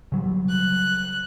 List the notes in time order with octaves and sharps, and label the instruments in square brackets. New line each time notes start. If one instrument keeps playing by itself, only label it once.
[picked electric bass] C#3 F#3 G3
[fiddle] F#6